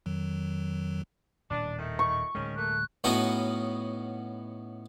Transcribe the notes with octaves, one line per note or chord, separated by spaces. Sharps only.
F2 D#3 F#3
D#1 A2 D4
D#3 A3 D#4
C#6
D1 D#3 G#3 C#4
A3 A#3 F#6
A2 B3 C#4 D#4 F#4